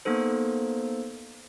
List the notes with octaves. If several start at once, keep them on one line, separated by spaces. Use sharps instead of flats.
A#3 B3 D#4 A4 C5